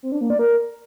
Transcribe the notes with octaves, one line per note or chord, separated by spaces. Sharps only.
C4
D4
A#3
D5
A#4